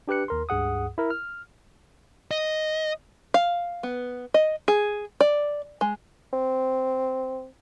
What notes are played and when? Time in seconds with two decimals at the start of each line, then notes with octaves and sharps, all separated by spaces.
0.08 D4 G4 B4 F#6 C#7
0.28 D#2 A#4 C6
0.49 C#2 G2 G#4 F#5 D#6
0.98 E4 A#4
1.10 F6
2.31 D#5
3.34 F5
3.83 B3
4.34 D#5
4.68 G#4
5.21 D5
5.81 G#3
6.33 C4